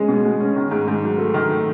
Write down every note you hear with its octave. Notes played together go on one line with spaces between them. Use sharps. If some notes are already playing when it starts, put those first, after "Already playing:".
Already playing: G#3 C#4 G#4
B2
G#3
C#4
D#3
G#2
G#2
F#3
A3
D#3
A3